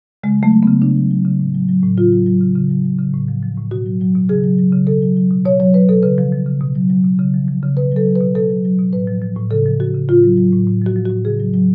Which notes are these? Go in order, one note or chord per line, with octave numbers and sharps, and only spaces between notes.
C#3 G#3
F#3 A3
F#3
B3
C#3
C#3 D4
F#3
F#3
C#3
A2
F#3
F#3
A2
C#3 F4
F#3
F#3
C#3
C#3
F#3
F#3
C#3
A2
F3
F3
A2
B2 F#4
F#3
F#3
B2
C#3 G#4
F#3
F#3
C#3
B2 A4
F#3
F#3
B2
B2 C#5
F#3 C#5
F#3 B4
B2 A4
C#3 B4
F3
F3
C#3
B2
F#3
F#3
B2
C#3
F3
F3
C#3
B2 B4
F#3 A4
F#3
B4
B2
B2 A4
F#3
F#3
B2
A2 B4
F3
F3
A2
C#3 A4
F3
F3 F#4
C#3
A2 F4
F#3
F#3
A2
A2
F3 F#4
F3
A2 F#4
C#3 G#4
F#3
F#3